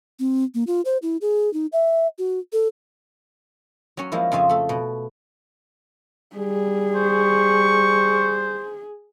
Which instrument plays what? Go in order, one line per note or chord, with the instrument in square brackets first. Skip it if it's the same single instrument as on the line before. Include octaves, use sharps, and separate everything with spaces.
[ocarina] C4
A#3
F4
C5
E4
G#4
D#4
E5
F#4
A4
[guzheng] F#3 C#4
F3 G#3 A#3 E4
F2 C#3 F4 G#5 A5
A3 A4
B2
[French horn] G3 [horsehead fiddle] G#4
[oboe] C5 [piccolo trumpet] C#6